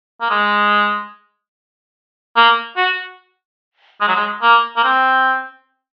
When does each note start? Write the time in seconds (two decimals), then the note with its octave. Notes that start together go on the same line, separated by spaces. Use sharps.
0.21 A#3
0.30 G#3
2.36 A#3
2.77 F#4
4.01 G#3
4.08 F#3
4.16 G#3
4.42 A#3
4.77 A#3
4.84 C4